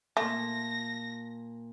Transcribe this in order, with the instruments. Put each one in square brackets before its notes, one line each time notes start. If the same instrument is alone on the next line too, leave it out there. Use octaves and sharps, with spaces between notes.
[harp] A#2 A5 [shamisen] A3 [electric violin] A#6